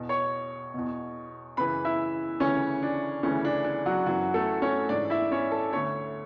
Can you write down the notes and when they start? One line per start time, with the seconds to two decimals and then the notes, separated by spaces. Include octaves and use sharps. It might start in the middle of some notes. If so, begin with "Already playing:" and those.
Already playing: E2 B2
0.09 C#5 C#6
0.74 E2 B2
1.57 F#2 C#3 E3 B4 B5
1.85 E4 E5
2.40 D2 C#3 E3 C#4 C#5
2.83 D4
3.23 D2 C#3 E3 C#4
3.45 D4
3.64 D4
3.86 F#3 F#4
4.06 F#2 E3 F#3 F#4
4.34 A3 A4
4.62 C#4 C#5
4.89 G#2 E3 D4 D5
5.10 E4 E5
5.32 C#4 C#5
5.51 A4 A5
5.73 D2 D3 C#5 C#6